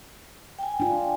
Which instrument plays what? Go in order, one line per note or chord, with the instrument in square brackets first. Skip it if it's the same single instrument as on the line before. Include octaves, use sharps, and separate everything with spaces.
[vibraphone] G5 G#5
[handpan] D4 F4